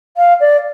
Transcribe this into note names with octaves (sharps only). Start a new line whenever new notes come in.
F5
D5